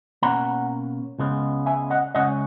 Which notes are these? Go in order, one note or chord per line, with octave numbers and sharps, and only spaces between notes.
B2 A#3 C#4 F#5 A#5
C#2 C#3 G#3 B3
E5 G#5
D#5 F#5
C#2 C#3 G#3 C#4 D#5 F#5